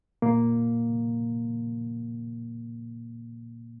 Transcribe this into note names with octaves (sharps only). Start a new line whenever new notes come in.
A#2 A#3